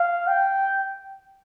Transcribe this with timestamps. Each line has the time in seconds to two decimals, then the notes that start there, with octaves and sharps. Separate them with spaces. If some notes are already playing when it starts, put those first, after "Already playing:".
Already playing: F5
0.28 G5